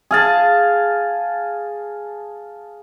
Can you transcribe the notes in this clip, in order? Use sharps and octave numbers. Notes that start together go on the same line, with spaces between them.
G#4 F5 A5